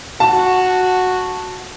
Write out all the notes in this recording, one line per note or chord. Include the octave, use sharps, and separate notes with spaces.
F#4 A5